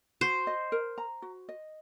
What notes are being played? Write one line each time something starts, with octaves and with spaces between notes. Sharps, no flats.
F#4 C5
D#5
A#4
A#5
F#4
D#5